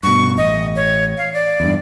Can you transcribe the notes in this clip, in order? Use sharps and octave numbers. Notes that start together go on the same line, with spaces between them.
G2 B2 C#6
A1 D#5
C#5
F5
D5
E2 G2